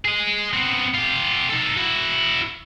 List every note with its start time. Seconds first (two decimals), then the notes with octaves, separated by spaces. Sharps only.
0.05 G#4 D#5
0.53 B3 C4
0.94 F4 G4
1.50 D#4 A4
1.77 E4 F#4